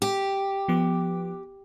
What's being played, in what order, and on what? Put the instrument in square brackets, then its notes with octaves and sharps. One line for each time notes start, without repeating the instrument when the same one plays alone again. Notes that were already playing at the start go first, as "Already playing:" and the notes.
[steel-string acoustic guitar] G4
[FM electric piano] F3 B3 D6